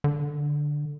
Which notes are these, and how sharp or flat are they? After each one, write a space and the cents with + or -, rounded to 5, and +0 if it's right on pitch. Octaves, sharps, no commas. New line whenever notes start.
D3 +5